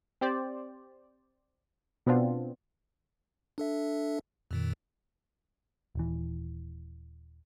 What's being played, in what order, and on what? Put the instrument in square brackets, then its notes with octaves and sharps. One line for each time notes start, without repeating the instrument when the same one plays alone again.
[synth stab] C4 G4 C5 D5
B2 B3 C4 D4 F4
[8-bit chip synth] D4 A4 E5
F2 A#2 D#3
[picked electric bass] D#1 E3